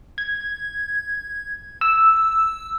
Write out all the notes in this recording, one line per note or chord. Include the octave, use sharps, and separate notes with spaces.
G#6
E6